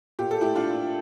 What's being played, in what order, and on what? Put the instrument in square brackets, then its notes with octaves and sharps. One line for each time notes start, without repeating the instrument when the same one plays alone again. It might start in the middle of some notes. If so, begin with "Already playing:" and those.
[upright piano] A#2 G4
A4
A3 E4 G4
D4 F4
A#2